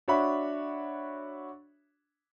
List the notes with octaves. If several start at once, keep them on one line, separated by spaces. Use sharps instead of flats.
D4 F#4 C#5 E5 B5